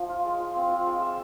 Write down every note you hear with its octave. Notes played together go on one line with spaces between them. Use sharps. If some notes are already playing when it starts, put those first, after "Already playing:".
Already playing: F3
F4
G#3
F4
C4
F4
G#3
E5